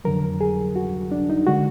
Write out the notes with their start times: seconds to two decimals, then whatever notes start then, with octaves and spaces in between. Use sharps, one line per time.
0.05 F2 D3 F#3 A#4
0.41 G#4
0.76 F#4
1.12 D4
1.30 D#4
1.47 D3 G#3 F#4